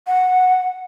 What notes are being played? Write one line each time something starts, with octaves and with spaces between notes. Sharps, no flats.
F#5